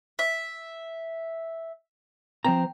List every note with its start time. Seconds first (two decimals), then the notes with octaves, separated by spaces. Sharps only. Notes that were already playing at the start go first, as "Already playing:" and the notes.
0.19 E5
2.44 F3 C4 C5 A#5